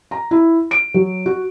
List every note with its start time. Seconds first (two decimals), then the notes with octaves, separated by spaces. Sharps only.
0.11 A#5
0.31 E4
0.71 D7
0.94 F#3
1.26 F#4